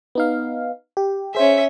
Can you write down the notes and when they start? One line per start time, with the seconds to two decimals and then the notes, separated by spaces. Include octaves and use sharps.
0.15 B3 D#4 F5
0.97 G4
1.35 C#4 G#4 C5 E5